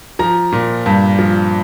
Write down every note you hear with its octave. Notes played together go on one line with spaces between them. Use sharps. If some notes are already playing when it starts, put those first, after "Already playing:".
F3 A#5
A#2
G2
F3